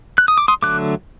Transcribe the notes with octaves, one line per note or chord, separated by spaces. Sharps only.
F#6
D#6
D6
C6 D#6
D3 F#3 A3 D6 F#6